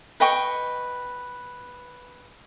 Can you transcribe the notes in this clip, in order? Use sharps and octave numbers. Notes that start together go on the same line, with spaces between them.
B4 D#5 G5 C#6